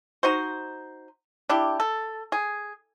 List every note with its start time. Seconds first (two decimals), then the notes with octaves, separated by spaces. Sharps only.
0.23 D#4 F#4 C5
1.49 D4 E4 G4
1.80 A4
2.32 G#4